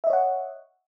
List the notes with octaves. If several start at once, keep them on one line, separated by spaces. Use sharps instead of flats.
C#5 D#5 E5 F#5